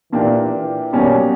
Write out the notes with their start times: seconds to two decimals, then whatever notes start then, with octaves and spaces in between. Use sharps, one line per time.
0.12 A#2 E3 A#3 D4 G4
0.53 E3
0.93 B2 F#3 G3 A#3 C#4